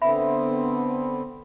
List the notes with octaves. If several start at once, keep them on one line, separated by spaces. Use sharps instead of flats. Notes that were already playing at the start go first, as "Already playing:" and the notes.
D3 B3 C4 E5 B5